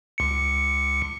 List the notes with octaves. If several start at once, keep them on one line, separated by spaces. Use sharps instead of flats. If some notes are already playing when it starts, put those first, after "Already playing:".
C#2 C#7